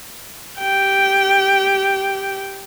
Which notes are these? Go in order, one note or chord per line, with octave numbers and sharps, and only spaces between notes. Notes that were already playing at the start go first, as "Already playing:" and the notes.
G4 G5